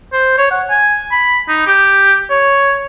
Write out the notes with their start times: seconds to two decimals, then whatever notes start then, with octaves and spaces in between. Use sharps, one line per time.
0.13 C5
0.38 C#5
0.51 F#5
0.70 G#5
1.12 B5
1.48 D#4
1.67 G4
2.30 C#5